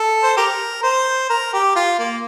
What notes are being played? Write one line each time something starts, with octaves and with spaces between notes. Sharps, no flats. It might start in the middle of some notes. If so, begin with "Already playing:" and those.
Already playing: A4
C5
G4 A#4
C5
A#4
G4
F4
A#3